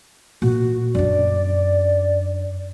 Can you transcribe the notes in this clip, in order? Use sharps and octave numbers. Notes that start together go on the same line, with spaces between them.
A#2 F#4
F#2 D4 D5